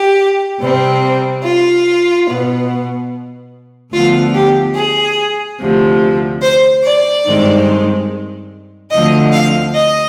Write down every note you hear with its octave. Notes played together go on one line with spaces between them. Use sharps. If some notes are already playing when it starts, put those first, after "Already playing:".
Already playing: G4
C3 G3 C4
F4
B2 B3
D2 D3 F3 B3 F4
G4
G#4
D2 C3 F3
C5
D5
G2 D#3 G#3 C4
D2 D3 F3 C4 D#5
F5
D#5